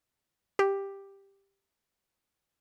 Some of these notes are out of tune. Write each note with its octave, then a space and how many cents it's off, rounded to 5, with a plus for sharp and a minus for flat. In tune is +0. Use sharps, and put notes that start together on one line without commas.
G4 +5